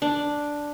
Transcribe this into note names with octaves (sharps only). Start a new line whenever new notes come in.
D4